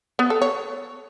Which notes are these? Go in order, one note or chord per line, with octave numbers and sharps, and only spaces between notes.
B3
A4
C#5